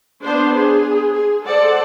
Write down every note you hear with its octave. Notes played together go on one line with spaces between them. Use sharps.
B3 D4 C5 C6
G#4
G#4
A4 C5 D5 F#5